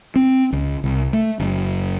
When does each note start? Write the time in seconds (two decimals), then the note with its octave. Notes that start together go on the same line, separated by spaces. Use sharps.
0.16 C4
0.52 C#2
0.84 C2
1.13 A3
1.39 F#1